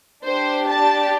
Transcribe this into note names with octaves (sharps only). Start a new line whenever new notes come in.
D4 G4 C5
A5